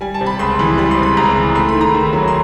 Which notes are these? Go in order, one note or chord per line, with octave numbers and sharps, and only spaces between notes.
G3 G#5
A5
C3
B5
C#2 C6
E3
G3 B5
C6
C3
B5
C#2 A#5
E3
A3 C6
B5
D#3
A#5
D#2
F#3
C6